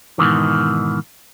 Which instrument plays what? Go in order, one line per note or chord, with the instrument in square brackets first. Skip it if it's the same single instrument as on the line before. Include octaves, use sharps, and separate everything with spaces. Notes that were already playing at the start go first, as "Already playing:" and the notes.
[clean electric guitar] G#2 B2 D#3 E3